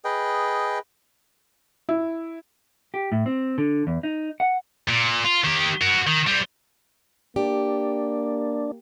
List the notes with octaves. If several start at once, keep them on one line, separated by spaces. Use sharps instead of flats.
G#4 B4 D#5 G5
E4
G4
A2
C4
D3
E2
D#4
F#5
A#2
F4
D#3 G4
F#4 A#4
D#3
G3 C4
A#3 D4 G4